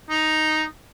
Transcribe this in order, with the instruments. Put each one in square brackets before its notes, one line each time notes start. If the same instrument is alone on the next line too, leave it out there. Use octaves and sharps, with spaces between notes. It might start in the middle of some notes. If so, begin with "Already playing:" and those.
[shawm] D#4